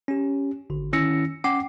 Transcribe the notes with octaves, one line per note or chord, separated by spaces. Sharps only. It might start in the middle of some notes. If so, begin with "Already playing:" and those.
C#4 G4
G#1 D3
D#3 C#4 E4 E6 A#6 C#7
C#4 F#5 G5 D6 C7